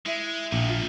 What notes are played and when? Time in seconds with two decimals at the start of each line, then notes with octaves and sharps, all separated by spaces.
0.06 G#3 E4 E5
0.52 A#1 A#2 D#3
0.69 F4